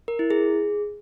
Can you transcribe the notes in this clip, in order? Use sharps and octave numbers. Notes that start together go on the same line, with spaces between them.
A#4
E4
G#4